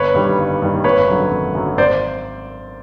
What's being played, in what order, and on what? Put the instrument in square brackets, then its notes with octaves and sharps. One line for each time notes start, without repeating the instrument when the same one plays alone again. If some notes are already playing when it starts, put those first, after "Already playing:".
Already playing: [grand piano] G1 B4 C#5
G2 D#3 G3
G1
G2 D#3 G3
G#1 B4 C#5
F#2 D3 F#3
G#1
F#2 D3 F#3
G#1 C5 D5